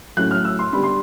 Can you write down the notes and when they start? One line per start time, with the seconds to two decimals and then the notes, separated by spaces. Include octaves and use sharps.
0.17 A2 F#3 A3 C#4 F#6
0.31 F6
0.45 E6
0.59 C6
0.73 D3 G3 B3 B5
0.84 C6